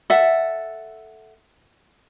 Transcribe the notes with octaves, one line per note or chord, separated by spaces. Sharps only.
A4 E5 F#5